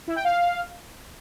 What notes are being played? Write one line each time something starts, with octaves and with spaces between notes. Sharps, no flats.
E4
G5
F5